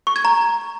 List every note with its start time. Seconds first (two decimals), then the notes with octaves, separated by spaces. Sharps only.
0.07 C#6
0.16 G#6
0.25 A#5